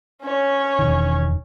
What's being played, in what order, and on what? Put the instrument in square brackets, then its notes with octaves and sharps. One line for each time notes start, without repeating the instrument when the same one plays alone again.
[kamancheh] C#4 C#5
[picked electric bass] E1 D#3